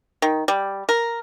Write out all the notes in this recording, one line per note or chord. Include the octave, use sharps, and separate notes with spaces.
D#3
G3
A#4